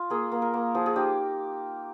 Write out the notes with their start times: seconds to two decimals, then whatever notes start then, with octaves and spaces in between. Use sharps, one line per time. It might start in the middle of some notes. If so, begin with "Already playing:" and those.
Already playing: F4
0.10 A#3 G#4
0.32 A#3
0.42 A#4
0.54 A#3
0.74 F3 G#4
0.86 G#4
0.96 D#4 G4